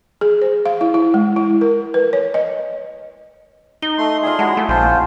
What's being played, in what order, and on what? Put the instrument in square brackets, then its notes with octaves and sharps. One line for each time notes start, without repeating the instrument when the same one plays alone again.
[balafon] G#4
C5
F5
E4
E4
G#3
E4
A#4
B4
C#5
D#5
[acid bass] D#4 [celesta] G7
[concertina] A3 C6
[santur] F4 D5 E5 [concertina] G#4
[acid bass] G#3 [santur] E4 F#4 C#5 [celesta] A5
[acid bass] A3
[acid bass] A#1 [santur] G#3 C4 B5 [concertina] F4 C5 [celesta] G#5 A5